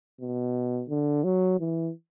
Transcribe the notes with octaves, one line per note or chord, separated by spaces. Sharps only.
B2
D3
F#3
E3